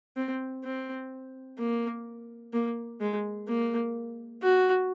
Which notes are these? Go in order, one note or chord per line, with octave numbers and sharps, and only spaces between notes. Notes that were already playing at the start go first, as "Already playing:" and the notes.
C4
C4
A#3
A#3
G#3
A#3
F#4